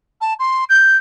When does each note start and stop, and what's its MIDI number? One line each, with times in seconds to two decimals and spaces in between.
0.21 0.34 81
0.39 0.64 84
0.69 0.96 91